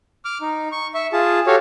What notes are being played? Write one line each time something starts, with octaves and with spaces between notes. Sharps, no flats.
D6 F6
D#4
C#6
E5 C#6
F4 G#4 A5
F#4 G4 A4 C#5 F5